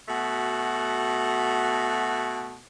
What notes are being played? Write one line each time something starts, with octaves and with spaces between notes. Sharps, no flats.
B2 A3 F#4